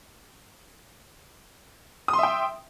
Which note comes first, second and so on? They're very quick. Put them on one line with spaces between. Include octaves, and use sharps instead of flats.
D#6 C6 E5 G5